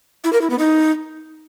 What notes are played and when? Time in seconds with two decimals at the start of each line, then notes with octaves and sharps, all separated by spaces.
0.24 E4
0.33 A#4
0.41 E4
0.50 B3
0.59 D#4